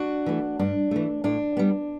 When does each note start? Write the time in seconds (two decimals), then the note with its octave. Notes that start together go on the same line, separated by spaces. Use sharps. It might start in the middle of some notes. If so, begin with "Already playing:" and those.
Already playing: D4 F#4
0.26 E3 A3
0.59 G2 D4
0.91 E3 A3
1.24 A2 D4
1.57 G3 B3